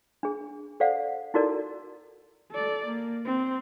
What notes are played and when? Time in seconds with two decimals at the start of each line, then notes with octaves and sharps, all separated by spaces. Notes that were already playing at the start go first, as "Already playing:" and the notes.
0.23 D4 G#4
0.80 A4 C5 D5 F5 F#5
1.34 D#4 E4 F#4 A4 A#4 D5
2.51 A4 D5
2.85 A#3
3.25 C4